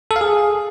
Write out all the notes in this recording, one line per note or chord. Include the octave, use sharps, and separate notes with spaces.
A4
F5
G#4